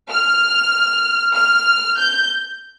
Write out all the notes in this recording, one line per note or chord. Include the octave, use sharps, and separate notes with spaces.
F6
F6
G6